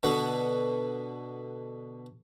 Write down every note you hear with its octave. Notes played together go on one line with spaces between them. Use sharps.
B2 D3 B3